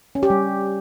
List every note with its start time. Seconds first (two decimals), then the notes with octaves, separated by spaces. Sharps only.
0.15 C#4
0.23 G4
0.30 G3